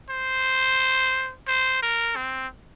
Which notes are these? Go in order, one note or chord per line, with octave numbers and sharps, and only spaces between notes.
C5
C5
A#4
C4